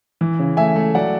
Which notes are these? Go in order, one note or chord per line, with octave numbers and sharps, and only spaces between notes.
E3
C#3
A3 E5 G#5
A3
F#3 D5 F#5